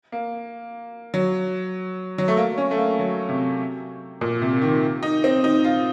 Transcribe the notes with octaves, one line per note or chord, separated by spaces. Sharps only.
A#3
F#3
F#3
A3
A#3
C#4
A3
A#3
F#3
C3
A#2
C3
D#3
D#4
C4
D#4
F4